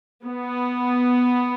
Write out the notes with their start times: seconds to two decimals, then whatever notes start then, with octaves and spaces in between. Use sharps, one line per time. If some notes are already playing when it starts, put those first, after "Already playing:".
0.24 B3